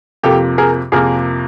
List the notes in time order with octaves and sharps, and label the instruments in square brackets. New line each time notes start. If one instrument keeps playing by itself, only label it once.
[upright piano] F2 C3 F3 A#3 G4 A4
G#4 A#4
F2 C3 F3 A#3 G#4 A#4